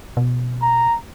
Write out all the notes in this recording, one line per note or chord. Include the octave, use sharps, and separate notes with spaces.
B2
A#5